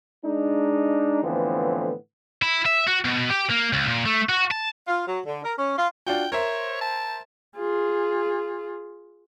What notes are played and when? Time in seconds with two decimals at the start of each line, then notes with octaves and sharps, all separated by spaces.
0.24 G#3 D4 D#4
1.22 A2 D3 E3 F3 B3 C4
2.42 E4
2.66 E5
2.88 F#4
3.05 B2
3.30 G4
3.50 A#3
3.73 C#2
3.88 A#2
4.06 A3
4.29 F#4
4.51 A5
4.87 F4
5.07 F#3
5.26 D3
5.44 A#4
5.57 C#4
5.77 F4
6.06 D4 F4 F#4 G5
6.32 A#4 C5 C#5 E5
6.81 A5
7.57 F4 G#4